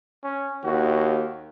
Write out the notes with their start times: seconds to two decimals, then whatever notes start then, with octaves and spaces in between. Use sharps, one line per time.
0.24 C#4
0.64 D#2 F#4